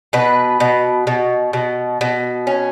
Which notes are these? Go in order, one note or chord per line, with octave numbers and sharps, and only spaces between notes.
B2 B4
B2
B2
B2
B2
C#4